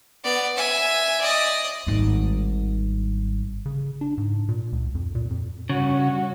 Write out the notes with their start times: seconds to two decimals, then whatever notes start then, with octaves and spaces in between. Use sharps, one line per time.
0.24 B3 D5
0.56 E5 G#5
1.21 D5 D#5
1.87 G#1 G2
3.66 C#3
4.01 D4
4.18 G#2
4.49 A#2
4.73 C#2
4.95 F2
5.15 A#2
5.30 F2
5.70 G2 C#3 C#4 F#4